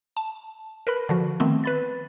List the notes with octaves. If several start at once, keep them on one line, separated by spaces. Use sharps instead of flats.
A5
A#4 B4 B5
D3 F3 F#4
D#3 A3 B3 C4
B4 B5 A6